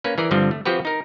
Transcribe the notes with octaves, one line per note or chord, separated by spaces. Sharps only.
A#3 C#4 B4
E3 G#4 A#4 D5
G2 D3 F3 G3 C4
A3
F3 C4 F#4 G4 B4
D#4 A#4